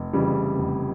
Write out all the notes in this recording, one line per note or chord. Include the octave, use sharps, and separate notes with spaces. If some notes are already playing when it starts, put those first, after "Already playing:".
Already playing: F1
F2 C#3 E3 G3
F1